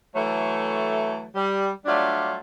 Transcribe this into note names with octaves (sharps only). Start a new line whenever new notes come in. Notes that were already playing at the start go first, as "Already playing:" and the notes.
E3 F#3 A3
G3
F#3 G3 A3 D4 F4